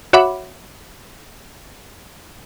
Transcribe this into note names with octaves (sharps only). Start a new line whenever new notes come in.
F#4 C#5 E5 F#5 B5 D6